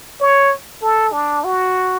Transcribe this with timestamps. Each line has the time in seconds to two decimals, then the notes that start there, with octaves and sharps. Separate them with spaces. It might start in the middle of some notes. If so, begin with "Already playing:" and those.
0.20 C#5
0.82 A4
1.13 D4
1.44 F#4